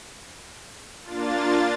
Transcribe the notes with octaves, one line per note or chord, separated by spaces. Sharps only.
A#3 D4 F4 A6